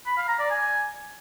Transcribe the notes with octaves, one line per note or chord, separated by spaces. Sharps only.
B5
F5
A#5
D5
G#5